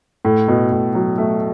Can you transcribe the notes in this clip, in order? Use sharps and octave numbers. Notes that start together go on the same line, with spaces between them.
A2
B2
A2
F#3
A3